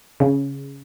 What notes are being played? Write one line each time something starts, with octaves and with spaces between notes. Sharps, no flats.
C#3